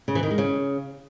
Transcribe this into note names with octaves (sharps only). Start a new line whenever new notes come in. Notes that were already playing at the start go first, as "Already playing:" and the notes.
C#3
E3
D#3
G#3
C#3